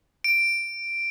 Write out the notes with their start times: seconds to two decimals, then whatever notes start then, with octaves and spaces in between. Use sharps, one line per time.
0.24 D7